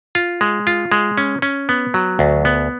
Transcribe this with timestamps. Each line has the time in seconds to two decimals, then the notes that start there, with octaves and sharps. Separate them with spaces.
0.15 F4
0.41 G#3
0.67 F4
0.92 G#3
1.18 C#4
1.42 C#4
1.69 B3
1.94 F#3
2.19 D2
2.45 B3